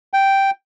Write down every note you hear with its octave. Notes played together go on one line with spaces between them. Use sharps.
G5